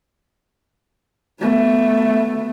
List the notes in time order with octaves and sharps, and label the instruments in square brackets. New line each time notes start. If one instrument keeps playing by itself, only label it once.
[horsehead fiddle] A3 B3